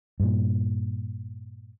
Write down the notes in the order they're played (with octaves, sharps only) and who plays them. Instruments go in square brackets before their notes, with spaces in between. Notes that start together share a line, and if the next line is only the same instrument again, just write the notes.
[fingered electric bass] G2 A#2